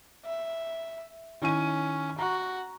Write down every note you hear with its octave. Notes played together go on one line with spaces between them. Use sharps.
E5
D#3 C#4 E4 D#7
F#4 A#5